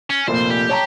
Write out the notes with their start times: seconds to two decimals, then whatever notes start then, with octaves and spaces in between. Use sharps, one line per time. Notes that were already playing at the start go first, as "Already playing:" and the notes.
0.10 C#4
0.28 F1 A#2 C5
0.50 G4
0.69 C#5 A5 A#5